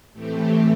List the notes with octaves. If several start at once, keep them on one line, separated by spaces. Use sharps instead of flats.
A2 E3 A3 C4 G4